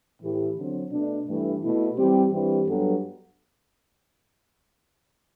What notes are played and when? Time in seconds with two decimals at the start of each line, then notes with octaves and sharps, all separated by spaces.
0.21 A2 E3 A3 E4 G4
0.56 D3 F#3 C4
0.91 B2 A3 D4
1.27 G2 E3 A3
1.61 B2 A3 E4
1.96 E3 G3 C4 G4
2.31 G2 E3 G3 C4 G4
2.66 G2 F#3 B3 F#4 A4